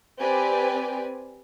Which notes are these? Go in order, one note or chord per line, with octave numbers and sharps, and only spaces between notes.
C4 G4 B4 D5 G#5